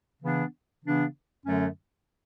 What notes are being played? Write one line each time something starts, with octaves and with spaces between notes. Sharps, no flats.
C#3 E3 B3 D4
C#3 E3 B3 D4
F#2 D3 F#3 A3 C#4